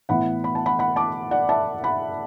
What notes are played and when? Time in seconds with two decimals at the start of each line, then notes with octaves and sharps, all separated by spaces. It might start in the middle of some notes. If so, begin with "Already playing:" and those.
0.09 A2 E3 B3 F#5 B5
0.44 B5
0.55 A5
0.66 F#5 B5
0.79 F#5 B5
0.96 A5 D6
1.31 D5 F#5
1.49 E5 A5
1.84 F#5 B5